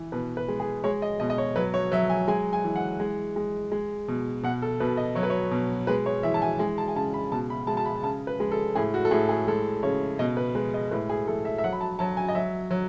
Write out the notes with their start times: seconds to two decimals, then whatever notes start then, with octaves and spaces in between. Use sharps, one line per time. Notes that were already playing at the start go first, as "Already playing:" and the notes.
Already playing: E3
0.12 B2 B4
0.37 B4
0.48 G#3
0.60 G#4
0.84 G#3 C#5
1.02 D#5
1.20 B2 D#5
1.30 D#5
1.38 C#5
1.56 F#3 B4
1.74 C#5
1.92 F#3 E5
2.10 G#5
2.28 G#3 G#5
2.53 G#5
2.64 E3
2.76 F#5
3.00 G#3
3.36 G#3
3.72 G#3
4.08 B2
4.43 B2 F#5
4.62 A4
4.80 B2 B4
4.97 D#5
5.15 F#3 C#5
5.23 B4
5.30 C#5
5.51 B2
5.87 G#3 B4
6.06 C#5
6.23 E3 E5
6.34 A5
6.42 G#5
6.59 G#3 G#5
6.78 A5
6.88 G#5
6.95 C#3 A5
7.14 B5
7.32 B2 A5
7.50 B5
7.67 G#3 A5
7.77 A5
7.86 B5
8.03 C#3 A5
8.27 B4
8.40 G#3
8.52 A4
8.75 A2 G#4
8.94 F#4
9.05 A4
9.11 A2 G#4
9.29 G#4
9.47 G#3 A4
9.83 C#3 C#5
10.19 B2 D#5
10.37 B4
10.55 G#3 B4
10.74 D#5
10.91 A2 B4
11.09 G#4
11.27 A2 A4
11.45 E5
11.58 E5
11.64 F#3 F#5
11.73 B5
11.81 A5
11.99 F#3 A5
12.17 G#5
12.28 D#5
12.35 F#3 E5
12.71 F#3